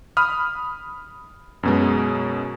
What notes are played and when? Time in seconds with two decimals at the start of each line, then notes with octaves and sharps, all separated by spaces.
0.17 B5 D#6 F6
1.63 F#2 B2 G#3